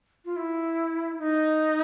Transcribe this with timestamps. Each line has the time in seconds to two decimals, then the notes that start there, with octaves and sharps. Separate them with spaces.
0.25 F4
0.36 E4
1.18 D#4